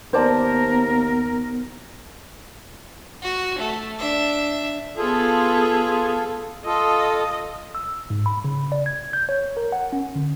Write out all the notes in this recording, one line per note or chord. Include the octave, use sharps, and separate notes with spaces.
D#2 B3 A#4 C5 D5 A5
F#4
A3
D4 E5
B3 F4 G#4 A4
F4 A4 D#5
E6
G#2
B5
C#3
D5
G#6
G6
C#5
A#4
F#5
C#4
D3